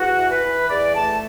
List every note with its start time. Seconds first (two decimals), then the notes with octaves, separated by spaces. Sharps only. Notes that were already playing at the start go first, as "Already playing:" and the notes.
Already playing: E2 F#4
0.17 E3
0.30 B4
0.44 E3
0.69 E2 D5
0.95 A3 A5